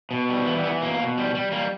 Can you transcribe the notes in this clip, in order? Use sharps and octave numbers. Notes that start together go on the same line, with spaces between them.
B2
G3
E3 B3
E3 B3
B2 A#3
B2
G3
G3
G3 A#3